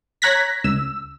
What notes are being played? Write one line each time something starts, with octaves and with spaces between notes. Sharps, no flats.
C#5 A#5 F#6 G#6 A#6 B6
C#2 E6